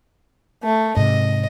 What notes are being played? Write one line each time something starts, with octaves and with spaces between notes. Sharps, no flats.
A3
G#2 C3 D#5